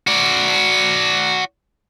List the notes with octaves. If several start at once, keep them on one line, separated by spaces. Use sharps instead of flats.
F#4 D5